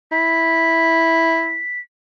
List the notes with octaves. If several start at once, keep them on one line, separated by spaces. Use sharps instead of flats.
E4 B6